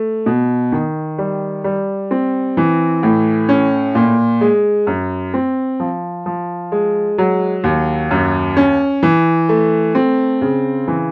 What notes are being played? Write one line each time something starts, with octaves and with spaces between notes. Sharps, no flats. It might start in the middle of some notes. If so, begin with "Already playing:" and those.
Already playing: A3
B2
D#3
G3
G3
C4
E3
A2
C#4
A#2
G#3
F#2
C4
F3
F3
G#3
F#3
D#2
F#2
C#4
E3
A3
C4
C#3
E3